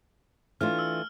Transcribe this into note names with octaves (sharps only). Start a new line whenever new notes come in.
E3 A3 D4 F4 F6
E6